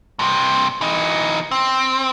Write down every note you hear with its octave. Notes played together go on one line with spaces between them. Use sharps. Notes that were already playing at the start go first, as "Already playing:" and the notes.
G2 C3
E3 D#4
C4